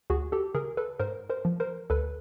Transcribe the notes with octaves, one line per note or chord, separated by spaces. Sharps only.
D2 F#4 G#4
G4 A4
C#3 G#4 A#4
A4 B4
G#2 A#4 C5
A#4 C5
F3
A#4 C5
D2 A4 B4